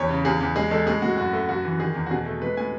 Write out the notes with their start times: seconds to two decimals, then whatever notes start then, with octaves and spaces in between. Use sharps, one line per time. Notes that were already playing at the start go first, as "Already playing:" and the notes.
Already playing: E2 C#5
0.09 C#3
0.25 E2 G#4
0.40 E2
0.56 G#3 G#4
0.71 G#3 A4
0.87 A2 G#4
1.02 A2 F#4
1.17 F#2 F#4
1.33 A3
1.49 F#2 F#4
1.65 E3
1.79 D#3 G#4
1.95 E2
2.06 F#4
2.11 B2 G#4
2.26 A3
2.42 G#3 B4
2.57 A2 G#5